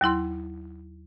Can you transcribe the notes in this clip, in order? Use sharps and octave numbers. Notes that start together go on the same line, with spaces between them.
D#2 F#3 E4 C6